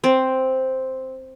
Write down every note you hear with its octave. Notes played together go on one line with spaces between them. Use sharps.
C4